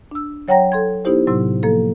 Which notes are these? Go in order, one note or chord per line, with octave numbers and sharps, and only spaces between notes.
D4 E6
F#3 C#5 F#5 G5 A#5 A#6
A4 C6 G#6
B3 D#4 E4 G4 C5
A2 C3 F#3 C6 E6
F3 A#3 A4